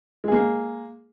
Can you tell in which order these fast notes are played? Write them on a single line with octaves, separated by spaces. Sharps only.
G#3 G#4 A#3